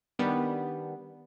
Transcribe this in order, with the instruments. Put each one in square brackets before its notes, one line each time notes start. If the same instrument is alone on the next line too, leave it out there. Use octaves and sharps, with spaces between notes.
[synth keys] D#3 G3 B3 D4